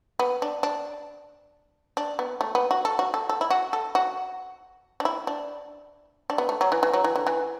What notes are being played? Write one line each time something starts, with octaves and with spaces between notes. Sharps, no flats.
B3
D4
D4
D4
B3
A3
B3
F#4
A4
F#4
A4
A4
E4
F#4
A4
F#4
D4
E4
D4
D4
B3
A3
F#3
E3
E3
F#3
E3
D3
E3